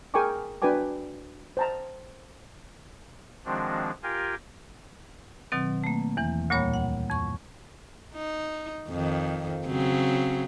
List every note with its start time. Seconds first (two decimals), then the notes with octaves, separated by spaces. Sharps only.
0.14 G#4 A#4 G5 G#5 C#6 D6
0.62 D4 F#4 B4 G5 G#5 D6
1.57 C5 A5 A#5
3.45 D#3 F3 G#3 C4 D4 F#4
4.03 F4 G4 A#4 F5 G5 G#5
5.52 B2 D#3 F#3 C4
5.84 A3 A#3
6.17 E2 E3
6.50 D2 A#2 G3 A#3 C#5 B5
6.74 F#5
7.10 F2 C#6
8.15 D#4
8.88 F2 D#3
9.65 C#3 F#3 C4